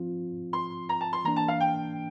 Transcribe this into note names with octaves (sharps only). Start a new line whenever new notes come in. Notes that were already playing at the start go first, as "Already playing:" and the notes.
Already playing: F3 C4 F4
C6
A#5
A5
C6
E3 A#3 D4 A#5
A5
F5
G5